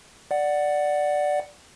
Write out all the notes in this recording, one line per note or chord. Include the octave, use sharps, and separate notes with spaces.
D5 F#5